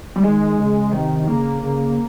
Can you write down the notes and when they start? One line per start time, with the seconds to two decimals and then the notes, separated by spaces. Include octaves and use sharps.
0.16 G3
0.23 D#3 G#3
0.58 C#3
0.92 C3 D#3
1.27 C#3 A#3
1.62 C#3